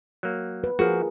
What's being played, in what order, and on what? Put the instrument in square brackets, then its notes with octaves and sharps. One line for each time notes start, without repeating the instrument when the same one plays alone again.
[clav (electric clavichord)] F#3 A#3
[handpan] B4
[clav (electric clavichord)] F3 F#4 [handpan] F4 G#4 A#4